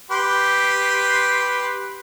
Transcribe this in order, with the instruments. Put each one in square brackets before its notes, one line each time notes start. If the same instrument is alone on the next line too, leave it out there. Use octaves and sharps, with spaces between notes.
[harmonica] G4 B4 C6